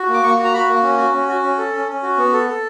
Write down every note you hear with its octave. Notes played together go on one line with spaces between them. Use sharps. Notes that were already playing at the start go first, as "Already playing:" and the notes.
Already playing: F#4
A#3
D6
A#3 C#6
F#4
A#5
F#4 B5
A#3
C#4
F#4
C#4
F#4
C#4
A4
C#4
C#4
F#4
B3
A4
A4